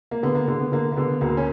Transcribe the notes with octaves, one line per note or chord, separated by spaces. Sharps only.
A#3
D3 B3
A#3
D3
B3
D3 A#3
A#3
D3 B3
D2 A#3
C#4